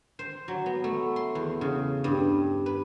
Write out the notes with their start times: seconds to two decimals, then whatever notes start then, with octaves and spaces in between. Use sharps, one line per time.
0.19 C5
0.48 F#3
0.66 B3
0.84 A3
1.16 C6
1.35 E2
1.61 C#3
2.04 G2
2.66 B4